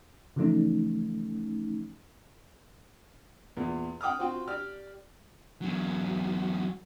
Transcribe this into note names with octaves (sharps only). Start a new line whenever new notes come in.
C#3 E3 F3 A3 C#4 D#4
E2 A#2
F#5 G5 D6 D#6 F6
C4 F4 F#4 G5
G4 D5 F6
E2 F#3